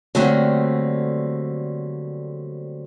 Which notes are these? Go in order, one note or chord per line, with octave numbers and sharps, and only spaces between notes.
D3 F#3 G3 A3 A#3 C4